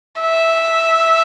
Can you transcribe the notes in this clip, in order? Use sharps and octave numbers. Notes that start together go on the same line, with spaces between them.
E5